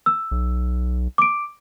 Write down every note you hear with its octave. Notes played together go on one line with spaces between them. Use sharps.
E6
B1
D6 D7